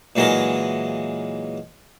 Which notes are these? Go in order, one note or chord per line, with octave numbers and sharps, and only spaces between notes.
A#2 E3 F#3 G#3 A#4